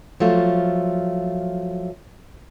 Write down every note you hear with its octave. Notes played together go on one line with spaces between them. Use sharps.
F3 F#3 A3 F4